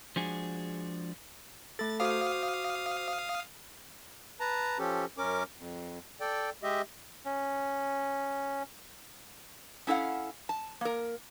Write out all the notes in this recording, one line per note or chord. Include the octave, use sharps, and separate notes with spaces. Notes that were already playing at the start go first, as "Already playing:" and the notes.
F3 G#3 D4 F#4 G#4
A3 A4 A6
F#4 C5 F5 D6 D#6
B4 A5 A#5
F3 C#4 G4 A4
F#2 C#4 A#4 D6
F2
A4 D5 G5
G#3 G4 D#5 E5
C#4
C#4 E4 A4 F5 F#5
A5
A#3 A#4